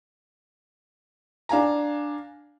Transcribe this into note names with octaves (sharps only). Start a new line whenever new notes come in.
D4 F5 G#5 A#5